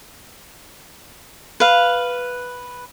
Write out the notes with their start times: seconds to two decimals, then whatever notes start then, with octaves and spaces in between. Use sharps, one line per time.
1.60 B4 F5